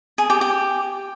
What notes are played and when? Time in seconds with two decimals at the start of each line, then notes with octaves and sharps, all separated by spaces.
0.18 G#4
0.30 G4
0.41 G4